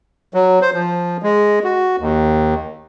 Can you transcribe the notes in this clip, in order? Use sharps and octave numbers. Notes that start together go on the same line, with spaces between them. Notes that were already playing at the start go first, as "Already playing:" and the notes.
F#3
C5
F3
G#3
F#4
D#2